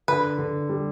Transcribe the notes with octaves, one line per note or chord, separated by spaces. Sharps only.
D3 B4
D3
G3